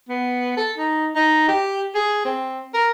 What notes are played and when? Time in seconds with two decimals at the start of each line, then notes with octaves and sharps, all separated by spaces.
0.09 B3
0.57 A4
0.78 D#4
1.15 D#4
1.48 G4
1.95 G#4
2.25 C4
2.74 A#4